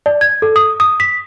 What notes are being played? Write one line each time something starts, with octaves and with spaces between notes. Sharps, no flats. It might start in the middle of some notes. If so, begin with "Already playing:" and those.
D5
G#6
A4
D#6
D#6
B6